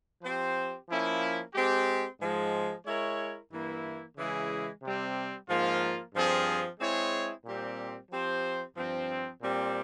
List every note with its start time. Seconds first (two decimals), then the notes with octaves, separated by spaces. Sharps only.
0.22 F3 C4 G4 C5
0.89 F3 A#3 C#4 E4
1.54 G#3 C4 G4
2.20 G#2 F3 G#3
2.86 G#3 E4 A#4 C#5
3.52 G2 E3 A#3 E4
4.17 C#3 E3 G#3 E4 G#4
4.83 C3 G3 C4
5.49 G#2 F3 A#3 F4
6.14 G2 F3 C4 F4 G#4
6.80 G#3 C4 E4 G#4 C#5
7.45 A#2 G3 C4 G4
8.11 F3 C4 G4 C5
8.77 G2 F3 C4
9.42 A#2 G3 C4